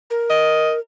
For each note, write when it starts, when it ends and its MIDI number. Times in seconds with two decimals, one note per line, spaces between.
0.10 0.79 70
0.30 0.73 75